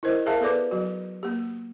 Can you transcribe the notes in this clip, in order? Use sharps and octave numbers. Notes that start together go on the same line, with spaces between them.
E4 A#4 C5 D#5
G#4 A#4 E5 F5 A5
B3 A4 B4 D5 D6
F#3 F#4
A#3 G4